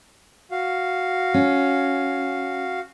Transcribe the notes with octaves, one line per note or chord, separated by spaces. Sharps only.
F#4 F5
C#4